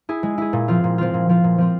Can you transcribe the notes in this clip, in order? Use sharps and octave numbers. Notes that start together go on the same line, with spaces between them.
E4 G#4
G#3
E4 G#4
A#2
F3 C4 F4
A#2
F3 C4 F4
A#2
F3 C4 F4
A#2
F3 C4 F4